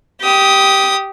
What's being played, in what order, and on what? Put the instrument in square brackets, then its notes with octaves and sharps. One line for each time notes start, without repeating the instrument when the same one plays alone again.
[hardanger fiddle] G4 D#6